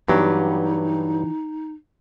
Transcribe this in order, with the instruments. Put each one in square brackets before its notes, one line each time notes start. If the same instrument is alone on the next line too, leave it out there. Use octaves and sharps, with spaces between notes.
[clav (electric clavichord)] G2 F#3 [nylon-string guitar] E3 B3 G4 [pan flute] D#4